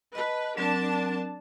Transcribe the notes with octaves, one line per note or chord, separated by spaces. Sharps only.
B4 D#5 A5
F#3 C4 D4 A#4 A5